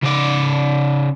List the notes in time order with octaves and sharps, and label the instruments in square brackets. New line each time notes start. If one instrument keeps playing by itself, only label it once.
[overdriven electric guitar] C#3 D5